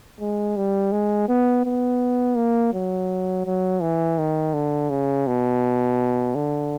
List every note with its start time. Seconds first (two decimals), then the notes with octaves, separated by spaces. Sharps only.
0.21 G#3
0.57 G3
0.92 G#3
1.28 B3
1.65 B3
2.37 A#3
2.73 F#3
3.46 F#3
3.81 E3
4.19 D#3
4.54 D3
4.90 C#3
5.27 B2
6.35 D3